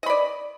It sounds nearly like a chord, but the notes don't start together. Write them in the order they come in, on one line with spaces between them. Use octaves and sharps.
D#5 B5 D5